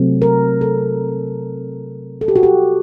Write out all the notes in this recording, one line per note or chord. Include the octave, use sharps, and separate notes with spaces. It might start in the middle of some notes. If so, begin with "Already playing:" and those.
Already playing: C3 F#3 A3 C4
A#4
A4
A4
G4
F#4
G4